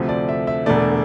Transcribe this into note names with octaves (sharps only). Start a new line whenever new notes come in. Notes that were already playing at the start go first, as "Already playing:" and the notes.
Already playing: D2 C3 F3 A3
D5
E5
E5
E1 E2 D3 A3 D5